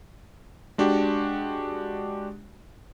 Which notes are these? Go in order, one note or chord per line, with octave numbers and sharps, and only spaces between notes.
G#3 D4 F#4 G4